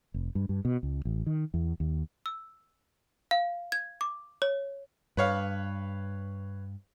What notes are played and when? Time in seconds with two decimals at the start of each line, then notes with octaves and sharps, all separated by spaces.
0.14 F1
0.35 G2
0.49 G2
0.65 B2
0.83 C#2
1.05 A1
1.26 D#3
1.54 E2
1.80 D#2
2.26 E6
3.31 F5
3.72 G#6
4.01 D6
4.42 C#5
5.17 G2 B4 C#5 F5